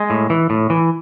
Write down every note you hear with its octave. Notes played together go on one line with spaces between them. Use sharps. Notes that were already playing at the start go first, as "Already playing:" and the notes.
Already playing: G#3
A2
E3
A2
E3